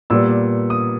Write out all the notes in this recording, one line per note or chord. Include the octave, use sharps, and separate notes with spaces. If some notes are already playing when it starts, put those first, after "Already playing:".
A#2 G3 B3 E6
D#6